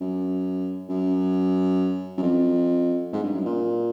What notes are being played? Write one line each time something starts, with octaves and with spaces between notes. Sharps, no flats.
F#2
F#2
F#2
F2
G#2
G2
F#2
A#2